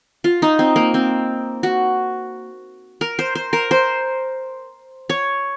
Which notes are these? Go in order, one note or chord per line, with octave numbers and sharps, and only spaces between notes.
F4
D#4
C4
A#3
C4
F#4
A#4
C5
C5
A#4
C5
C#5